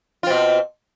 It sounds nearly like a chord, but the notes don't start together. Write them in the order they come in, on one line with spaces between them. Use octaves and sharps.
F4 C4 B2